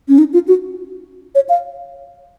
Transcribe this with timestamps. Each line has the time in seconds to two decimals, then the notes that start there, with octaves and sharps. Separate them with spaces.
0.08 C#4
0.18 D#4
0.33 F4
0.48 F#4
1.35 C#5
1.49 F5